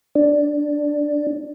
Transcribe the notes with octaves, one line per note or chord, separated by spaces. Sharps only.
D4